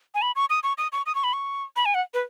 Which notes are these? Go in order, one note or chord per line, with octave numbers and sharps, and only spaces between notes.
G#5
B5
C#6
D#6
C#6
D#6
C#6
D#6
C#6
B5
C#6
B5
G#5
F#5
B4